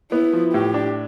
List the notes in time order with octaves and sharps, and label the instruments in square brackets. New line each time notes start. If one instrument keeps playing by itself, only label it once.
[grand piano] B3 [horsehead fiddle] E4
[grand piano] F3
[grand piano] A2 [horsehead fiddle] G4
[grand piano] D4